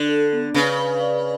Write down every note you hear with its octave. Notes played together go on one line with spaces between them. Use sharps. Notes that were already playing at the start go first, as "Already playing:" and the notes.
Already playing: D3
A4
B3
C#3 B4
B4
D5